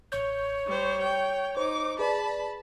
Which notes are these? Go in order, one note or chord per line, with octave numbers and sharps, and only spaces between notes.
A1 C#5 C#6 G6
G3 C5
G5
D#4 C5 D6
G#4 B4 D5 A5 B5